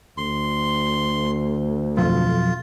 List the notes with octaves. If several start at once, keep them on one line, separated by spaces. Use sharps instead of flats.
D2 C6
B1 F2 F4